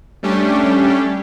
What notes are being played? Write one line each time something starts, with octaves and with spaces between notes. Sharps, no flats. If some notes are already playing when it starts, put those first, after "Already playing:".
G3 A3 C#4 D4 G4